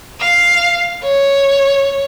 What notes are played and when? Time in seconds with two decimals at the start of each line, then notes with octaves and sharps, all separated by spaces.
0.20 F5
1.03 C#5